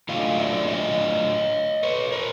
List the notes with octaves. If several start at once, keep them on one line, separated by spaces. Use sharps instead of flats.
A2 F#3 A3 D4 F4 D#5 F5
D5 E5
C#5 D#5
B4 C#5
A#4 C5